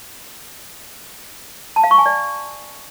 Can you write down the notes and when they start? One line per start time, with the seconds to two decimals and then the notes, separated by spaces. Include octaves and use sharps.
1.76 A5
1.84 F5
1.91 C#6
1.98 G#5
2.06 D5